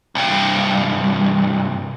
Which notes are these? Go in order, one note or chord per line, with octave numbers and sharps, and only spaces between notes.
C2 G2